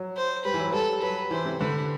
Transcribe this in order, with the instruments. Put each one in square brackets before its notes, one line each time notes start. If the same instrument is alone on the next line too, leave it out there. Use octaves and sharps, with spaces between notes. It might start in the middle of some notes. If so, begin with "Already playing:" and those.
Already playing: [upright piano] F#3
[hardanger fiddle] C5
[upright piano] G3 [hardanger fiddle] B4
[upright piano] E3
F#3
[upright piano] G3 [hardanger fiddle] A4
[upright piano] F#3 [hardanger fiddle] B4
[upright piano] E3 [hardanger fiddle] C5
[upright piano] C3
[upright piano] D3 [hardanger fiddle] B4